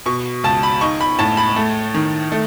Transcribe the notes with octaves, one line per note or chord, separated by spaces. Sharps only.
B2 C#6
C#2 A5
B5
D#4 C#6
B5
A2 A5
B5
A3
D#3
A3